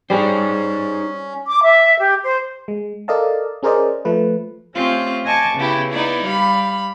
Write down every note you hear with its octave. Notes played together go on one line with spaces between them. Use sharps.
G3 C#4 D#4 G#4 C5
D6
E5
G4
C5
G#3
A4 A#4 D5 D#5 F5 A5
C#4 G#4 A#4 C5 D5 D#5
F3 A3 B4
A3 C4 C#4 F4 G4
D#5 G#5 A5 C#6 D6
C#3 B3 E4 G4
B3 D#4 E4 D5
G3 F5 B5